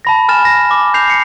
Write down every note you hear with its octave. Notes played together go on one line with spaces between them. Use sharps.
A5 B5 A#6
G#5 F6 A6 E7
A#6
D6
G6 C7 F7
C7 C#7